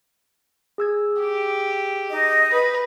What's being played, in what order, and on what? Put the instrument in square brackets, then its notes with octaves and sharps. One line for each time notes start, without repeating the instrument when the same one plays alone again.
[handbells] G#4 E6 G#6
[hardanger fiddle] G4
[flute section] D#4 D#5
[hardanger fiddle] B4